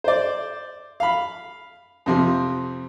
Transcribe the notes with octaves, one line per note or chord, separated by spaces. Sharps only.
C5 D5
F5 B5
F2 C3 F3